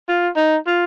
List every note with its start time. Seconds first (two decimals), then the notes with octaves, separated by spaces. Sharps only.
0.09 F4
0.37 D#4
0.67 F4